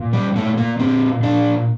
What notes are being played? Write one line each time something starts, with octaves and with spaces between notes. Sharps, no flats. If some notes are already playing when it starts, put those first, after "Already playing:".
Already playing: A#2
G3
A#2 A3
A#3
A#2 C4
A#2 D4